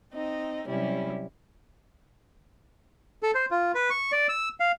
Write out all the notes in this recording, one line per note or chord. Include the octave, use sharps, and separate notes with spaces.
C4 D#4 D#5
C3 F#3 G3 C#4 E4
A4
C5
F4
B4
C#6
D5
E6
F5